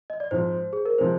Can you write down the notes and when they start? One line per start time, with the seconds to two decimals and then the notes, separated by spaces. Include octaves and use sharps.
0.10 D#5
0.20 D5
0.31 G#2 F3 C4 C5
0.73 G#4
0.85 A#4
0.98 C3 F3 G#3 D#4 C5